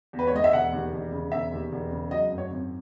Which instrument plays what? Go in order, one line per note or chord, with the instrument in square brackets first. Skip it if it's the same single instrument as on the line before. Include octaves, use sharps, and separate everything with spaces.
[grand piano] E2
B4
C#5
G#3 D#5
E5
E1 F#5
D#2
E1
C#3
E1 E5
D#2
E1
C#3
F#3 D#5
F#2
C#5
G#1